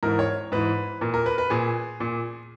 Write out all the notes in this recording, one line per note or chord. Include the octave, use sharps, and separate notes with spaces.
G#2 E3 A#4
C#5
G#2 E3 B4
A#2 A#4
A#4
B4
B4
A#2 G#4
A#2